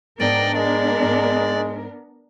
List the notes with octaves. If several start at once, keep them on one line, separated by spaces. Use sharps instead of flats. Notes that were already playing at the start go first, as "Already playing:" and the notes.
G#2 B3 D4 A#4 D5 D#5 G5
G#3 D5
G#2